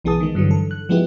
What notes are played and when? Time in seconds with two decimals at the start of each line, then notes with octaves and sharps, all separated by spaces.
0.04 B1 E3 B3 G#4 A5 D#6
0.20 D#3 G#3
0.35 G2 D3 E3 F#3
0.51 A4
0.71 F#6
0.89 F3 G#3 B3 E4 G4